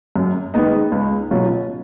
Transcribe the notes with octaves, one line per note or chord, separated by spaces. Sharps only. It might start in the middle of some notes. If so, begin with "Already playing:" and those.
F#2
D#3 G#3 B3 D#4
C#2
B2 F#3 C#4 F4